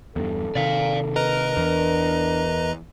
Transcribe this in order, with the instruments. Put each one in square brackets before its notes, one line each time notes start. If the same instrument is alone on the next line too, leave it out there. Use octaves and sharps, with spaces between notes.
[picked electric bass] E2 G2 [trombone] A4
[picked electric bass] C3 D#3 [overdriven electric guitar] D5 F5
[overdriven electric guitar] A#4 [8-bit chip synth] B4 D#5 A#5
[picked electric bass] E2 [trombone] D4